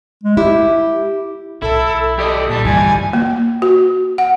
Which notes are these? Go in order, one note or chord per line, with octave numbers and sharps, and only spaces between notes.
G#3
E4 G4
B1 E4 A4
G4 A4 D5 D#5
A#2 G3 A5
D2 G2 E3 G3 G#5
A#3
F#4
F#5